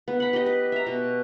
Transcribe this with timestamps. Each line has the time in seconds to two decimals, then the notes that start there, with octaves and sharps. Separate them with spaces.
0.08 B3
0.20 F#5 B5
0.33 G4 D#5
0.46 B4
0.72 E5 A#5
0.86 B2